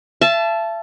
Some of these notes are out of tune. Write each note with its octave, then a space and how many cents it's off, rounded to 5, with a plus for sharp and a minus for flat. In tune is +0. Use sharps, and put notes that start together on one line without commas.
E5 +40 A5 -10